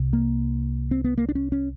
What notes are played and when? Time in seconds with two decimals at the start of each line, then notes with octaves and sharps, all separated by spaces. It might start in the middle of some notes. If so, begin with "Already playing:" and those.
Already playing: C2 C3
0.13 A#3
0.91 C4
1.04 B3
1.18 A#3
1.29 D4
1.35 C#4
1.52 C#4